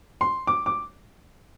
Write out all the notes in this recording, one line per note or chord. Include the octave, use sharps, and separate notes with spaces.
C6
D6
D6